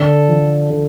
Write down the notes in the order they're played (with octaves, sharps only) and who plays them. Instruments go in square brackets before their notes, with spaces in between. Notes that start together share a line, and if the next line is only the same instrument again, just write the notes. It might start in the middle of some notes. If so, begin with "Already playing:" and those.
Already playing: [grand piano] D3 [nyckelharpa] A4
[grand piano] F3
D3